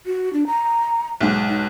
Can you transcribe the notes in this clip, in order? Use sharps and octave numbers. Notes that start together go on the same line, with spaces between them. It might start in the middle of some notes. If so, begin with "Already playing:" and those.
F#4
D4
A#5
B1 G#2
D#4